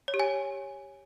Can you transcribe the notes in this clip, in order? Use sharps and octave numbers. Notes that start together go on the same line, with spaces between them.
C#5
G4
G#5